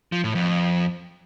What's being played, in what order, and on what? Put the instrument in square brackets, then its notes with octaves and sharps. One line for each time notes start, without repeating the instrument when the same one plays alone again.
[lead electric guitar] F3
A2
F2